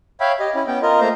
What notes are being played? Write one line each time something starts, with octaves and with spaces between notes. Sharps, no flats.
C#5 E5 F5 G5 B5
G4 D#5
C#4 E4
B3 C#4 G5
F4 A#4 D#5
A3 A#3 C5 A#5